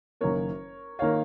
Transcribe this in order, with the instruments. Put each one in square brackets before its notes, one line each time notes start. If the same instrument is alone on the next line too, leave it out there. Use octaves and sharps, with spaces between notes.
[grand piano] F#1 F#2 D#3 A#3 [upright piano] A#4 C#5
[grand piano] D#3 A#3 [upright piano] C#5 F5